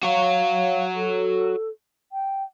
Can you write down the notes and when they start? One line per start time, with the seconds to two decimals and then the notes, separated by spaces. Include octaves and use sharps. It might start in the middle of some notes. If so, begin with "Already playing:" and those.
0.03 F#4 C#5 F5
0.94 A4
2.12 G5